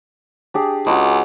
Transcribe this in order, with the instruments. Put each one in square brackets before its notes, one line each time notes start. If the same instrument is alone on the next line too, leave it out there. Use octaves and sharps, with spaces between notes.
[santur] D4 G4 G#4
[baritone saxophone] C#2 [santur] F#4 D#5